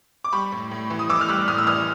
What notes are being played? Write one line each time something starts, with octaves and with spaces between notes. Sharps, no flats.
D6
G3 B5 C#6
A2
A2
E3
D#6
E3 D6 E6
F6
G3 E6 F#6
A2 D#6 F6
E6
E3 D#6 F6